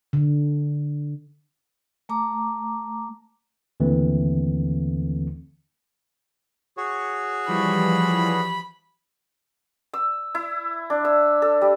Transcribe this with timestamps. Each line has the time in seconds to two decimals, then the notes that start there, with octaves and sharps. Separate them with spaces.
0.13 D3
2.09 A3 A#5 D6
3.80 D#2 D3 E3 A3 C4
6.77 F#4 G#4 C#5
7.48 E3 F3 G3 B5
9.93 E6
10.35 E4
10.90 D4
11.05 E6
11.42 A4
11.61 G3